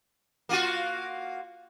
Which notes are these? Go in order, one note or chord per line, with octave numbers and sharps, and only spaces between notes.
A#3 F4 F#4